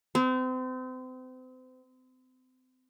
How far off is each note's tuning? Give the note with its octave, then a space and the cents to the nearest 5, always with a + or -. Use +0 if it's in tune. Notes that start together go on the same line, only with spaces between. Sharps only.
C4 -35